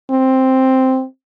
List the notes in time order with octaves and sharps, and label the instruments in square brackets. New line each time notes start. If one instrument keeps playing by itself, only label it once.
[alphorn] C4